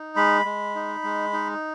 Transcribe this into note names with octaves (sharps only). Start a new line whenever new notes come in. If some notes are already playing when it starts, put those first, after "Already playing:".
Already playing: D#4
G#3 B5
G#3
D#4
G#3
D#4